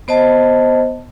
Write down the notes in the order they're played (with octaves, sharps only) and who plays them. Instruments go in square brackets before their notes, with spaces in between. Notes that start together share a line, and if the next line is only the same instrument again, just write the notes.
[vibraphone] B3 C5 D#5 A5